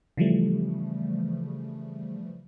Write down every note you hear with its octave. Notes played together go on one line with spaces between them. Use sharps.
C#3 E3 F3 G3 A3